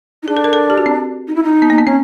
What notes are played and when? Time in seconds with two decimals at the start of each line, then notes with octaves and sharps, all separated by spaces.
0.23 D#4
0.28 D4 G#4
0.37 A4
0.44 A#4
0.53 A4
0.70 G4
0.78 F#4
0.86 C4
1.28 D#4
1.35 E4
1.43 D#4
1.62 B3
1.70 A#3
1.78 B3
1.86 C4 C#4